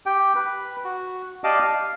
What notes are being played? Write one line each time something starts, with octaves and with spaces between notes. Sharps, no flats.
G4 G5
B4
F#4
G4 D5 D#5 F5 A5 D6
F5